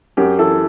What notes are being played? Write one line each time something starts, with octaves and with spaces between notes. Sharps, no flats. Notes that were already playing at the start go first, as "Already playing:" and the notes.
F#2 G4
E3 A4